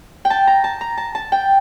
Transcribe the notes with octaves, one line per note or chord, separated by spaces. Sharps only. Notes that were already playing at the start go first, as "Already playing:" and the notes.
G5
A5
A#5
A5
A#5
A5
A5
G5